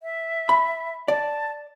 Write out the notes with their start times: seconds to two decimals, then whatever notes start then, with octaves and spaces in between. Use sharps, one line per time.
0.03 E5
0.49 B5
1.08 D5 A5